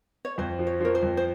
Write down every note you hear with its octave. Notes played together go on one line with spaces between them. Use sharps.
C#5
F2 C5
F3
C#5
F3 A#4 C#5
C5
F2
C5